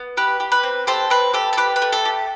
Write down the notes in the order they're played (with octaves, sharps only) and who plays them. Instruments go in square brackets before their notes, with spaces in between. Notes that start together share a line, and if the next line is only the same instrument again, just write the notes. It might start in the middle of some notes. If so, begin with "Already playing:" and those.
Already playing: [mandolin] B3
G4 B4
G4
B4
C4
G4 A4 C5
C4 B4
G4 A4
A4
G4 B4
B4
A3
A4
G4